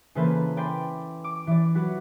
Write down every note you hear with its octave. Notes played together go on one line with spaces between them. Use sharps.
C#3 E3 A#3 A4 B4 C5
D5 G5 G#5 B5 C6
D6
E3 D5
F#3 F#4 B4